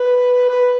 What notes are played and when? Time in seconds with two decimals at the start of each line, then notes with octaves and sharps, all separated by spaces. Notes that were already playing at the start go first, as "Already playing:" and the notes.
Already playing: B4
0.49 B4